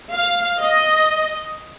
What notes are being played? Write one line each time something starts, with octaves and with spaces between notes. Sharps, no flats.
F5
D#5